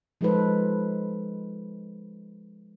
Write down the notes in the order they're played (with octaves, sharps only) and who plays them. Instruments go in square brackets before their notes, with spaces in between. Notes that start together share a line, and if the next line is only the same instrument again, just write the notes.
[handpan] F3 G#3 D#4 A4 B4 C5